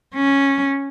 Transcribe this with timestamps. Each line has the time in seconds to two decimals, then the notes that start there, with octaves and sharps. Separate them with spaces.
0.14 C#4